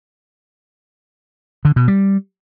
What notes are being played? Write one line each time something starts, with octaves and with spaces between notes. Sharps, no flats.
D3
B2
G3